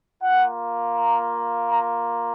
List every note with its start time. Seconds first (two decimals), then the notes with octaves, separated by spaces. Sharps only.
0.23 A#3 F4 F#5
0.96 A#5
1.69 A#5